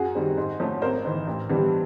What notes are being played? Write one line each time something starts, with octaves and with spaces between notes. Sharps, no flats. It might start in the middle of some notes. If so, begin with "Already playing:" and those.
Already playing: F#2 F#4 G#4
D#3 G3 C4
G#2
F3 A3 C#4
G#1 A#4 C5
G#2 E3
A1
G2 E3 G3 B3